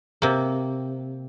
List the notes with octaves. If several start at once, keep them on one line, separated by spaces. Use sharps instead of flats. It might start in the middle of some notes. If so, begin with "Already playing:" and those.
C3 A#3